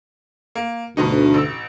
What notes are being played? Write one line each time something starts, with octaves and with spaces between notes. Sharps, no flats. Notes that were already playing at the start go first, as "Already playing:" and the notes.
A#3
D2 G2 B2 D#4
A1 E6